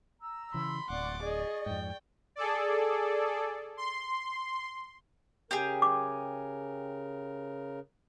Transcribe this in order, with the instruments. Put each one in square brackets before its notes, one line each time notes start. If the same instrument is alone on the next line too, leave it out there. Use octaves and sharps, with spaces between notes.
[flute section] A#5 E6
[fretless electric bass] C#3 E3 [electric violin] B5 [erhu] C6
[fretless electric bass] D1 [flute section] D5 C#6 [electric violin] F#5 D6
[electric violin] G#4 [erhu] D#5
[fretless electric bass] F2 G#2 [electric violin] G5
[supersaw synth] G#4 A4 D5
C6
[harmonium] C#3 A#4 [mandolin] G4 G#4
[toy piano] D6